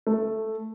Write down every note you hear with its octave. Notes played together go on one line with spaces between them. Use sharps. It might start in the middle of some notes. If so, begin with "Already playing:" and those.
A3